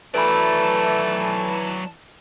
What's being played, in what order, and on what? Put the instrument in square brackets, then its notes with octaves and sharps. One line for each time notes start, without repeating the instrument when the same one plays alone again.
[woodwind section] E3 A5 [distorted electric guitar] F#3 D5 [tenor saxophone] A3 [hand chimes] B4 B5